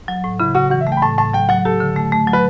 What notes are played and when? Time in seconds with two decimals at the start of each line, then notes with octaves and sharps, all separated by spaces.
0.08 F#3
0.24 A2
0.40 C#3 E4
0.55 C#3 F#4
0.70 E3 F#4
0.81 E5
0.87 A3
0.92 G5
0.97 B5
1.02 A2 A5
1.18 A2 A5
1.34 F#3 G5
1.49 F#3 F#5
1.65 G4 A4
1.80 D3
1.96 A3
2.12 A3
2.27 F#3
2.33 B4